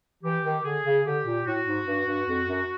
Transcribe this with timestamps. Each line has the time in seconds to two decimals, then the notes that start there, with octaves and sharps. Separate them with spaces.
0.23 E3 G4
0.43 D#3
0.64 D3 G#4
0.84 C#3
1.05 D3 G4
1.26 A#2
1.46 A2 F#4
1.66 G#2
1.86 G2
2.06 G2
2.27 F2
2.47 F#2